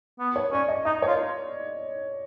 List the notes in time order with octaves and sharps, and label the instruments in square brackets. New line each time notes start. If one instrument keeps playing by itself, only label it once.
[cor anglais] B3
[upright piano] C#5
[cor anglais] C#4 [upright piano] D5
[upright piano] D#5
[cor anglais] D#4 [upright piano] D#5
[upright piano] C#5
[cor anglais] F4